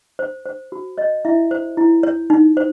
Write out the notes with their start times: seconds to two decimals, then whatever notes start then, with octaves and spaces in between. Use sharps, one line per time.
0.19 C5
0.45 C5
0.72 F#4
0.98 C#5 D#5
1.25 E4 E5
1.51 C5
1.77 E4
2.03 C#5
2.30 D#4
2.57 C5